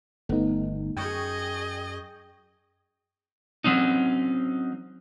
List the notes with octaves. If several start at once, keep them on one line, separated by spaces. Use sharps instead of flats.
G1 A3 B3 D#4
F#2 G#4 D#5 G5 C#6 G6
F#3 C4 C#4 D#4